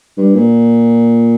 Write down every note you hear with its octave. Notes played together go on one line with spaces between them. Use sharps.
G2
A#2